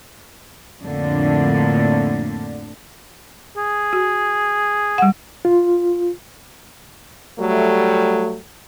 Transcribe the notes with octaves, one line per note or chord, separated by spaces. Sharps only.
F2 A2 D3 A#3 D4
G#4
F#4
G3 F#5
F4
F#3 G3 A3